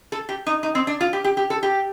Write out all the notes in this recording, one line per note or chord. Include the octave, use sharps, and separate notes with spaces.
A4
G4
D#4
D#4
C4
D4
F4
G4
G4
G4
A4
G4